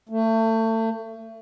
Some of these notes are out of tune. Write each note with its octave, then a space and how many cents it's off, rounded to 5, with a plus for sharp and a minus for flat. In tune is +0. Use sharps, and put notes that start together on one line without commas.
A3 +30